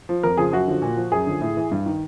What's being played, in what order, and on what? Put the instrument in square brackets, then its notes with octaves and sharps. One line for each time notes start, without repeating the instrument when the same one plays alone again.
[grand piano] F3
F2 A#4
C#3 F3 G#4
F#2 F#4
D3 F3
A#2
F3
F#2 G#4
D3 F3
A2
E3
G2
D#3